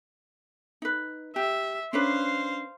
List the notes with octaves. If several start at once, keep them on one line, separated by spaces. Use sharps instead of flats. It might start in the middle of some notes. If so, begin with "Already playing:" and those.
D#4 B4
G4 E5
C#4 D4 B4 C5 F5